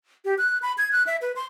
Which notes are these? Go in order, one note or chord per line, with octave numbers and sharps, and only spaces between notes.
G4
F#6
B5
G#6
F#6
E5
B4
C6